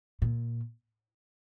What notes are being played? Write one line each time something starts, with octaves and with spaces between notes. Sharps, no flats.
A#2